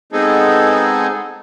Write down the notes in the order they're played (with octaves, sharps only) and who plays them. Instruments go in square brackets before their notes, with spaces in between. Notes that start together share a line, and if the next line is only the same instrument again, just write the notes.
[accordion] G#3 B3 C4 D#4 G#4 A4